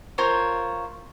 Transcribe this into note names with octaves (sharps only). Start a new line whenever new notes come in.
F4 A#4 C5 C#5